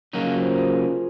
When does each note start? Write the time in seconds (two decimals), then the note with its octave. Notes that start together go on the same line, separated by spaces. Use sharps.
0.13 C#3 F#3 A#3 D#4 F#4
0.24 F4
0.36 C5
0.47 A#4
0.58 G#4